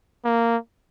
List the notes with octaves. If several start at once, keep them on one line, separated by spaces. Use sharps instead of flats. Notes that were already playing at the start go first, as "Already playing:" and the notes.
A#3